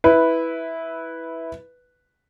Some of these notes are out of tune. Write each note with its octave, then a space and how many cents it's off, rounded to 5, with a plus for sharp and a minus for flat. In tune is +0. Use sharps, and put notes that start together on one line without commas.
E4 -10 B4 +0